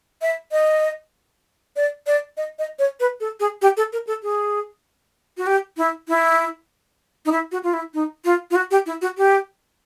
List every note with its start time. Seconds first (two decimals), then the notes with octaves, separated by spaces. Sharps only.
0.22 E5
0.52 D#5
1.76 D5
2.07 D5
2.37 D#5
2.59 D#5
2.79 C#5
3.00 B4
3.20 A4
3.40 G#4
3.62 G4
3.77 A4
3.92 A#4
4.07 A4
4.23 G#4
5.37 F#4
5.46 G4
5.77 E4
6.08 E4
7.25 D#4
7.32 E4
7.52 F#4
7.63 F4
7.73 E4
7.94 D#4
8.25 F4
8.51 F4
8.55 F#4
8.71 G4
8.86 E4
9.01 F#4
9.17 G4